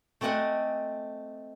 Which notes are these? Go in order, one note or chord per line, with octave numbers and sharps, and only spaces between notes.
A3 C4 D5 D#5 F#5 G#5